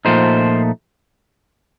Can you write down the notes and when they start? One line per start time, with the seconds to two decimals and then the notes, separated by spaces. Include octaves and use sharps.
0.05 A#2 F3 A3 D#4 C5